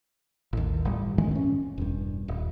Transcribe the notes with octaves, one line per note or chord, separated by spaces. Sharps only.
A1 D#2
G1 A2 G3
A2 D#3 E3 G#3
C4 C#4
E1 G2
D#1